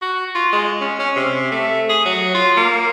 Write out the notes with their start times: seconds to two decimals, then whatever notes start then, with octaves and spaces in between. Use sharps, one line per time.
0.02 F#4
0.35 F4
0.52 G#3
0.81 C#4
0.99 C#4
1.16 C3
1.51 A3
1.89 G#4
2.06 F#3
2.35 F4
2.57 A#3